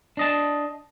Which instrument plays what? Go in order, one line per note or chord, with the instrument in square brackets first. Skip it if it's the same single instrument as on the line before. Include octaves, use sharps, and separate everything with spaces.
[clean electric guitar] D4 D#5 A5